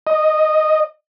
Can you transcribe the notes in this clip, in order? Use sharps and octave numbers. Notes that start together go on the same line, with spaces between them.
D#5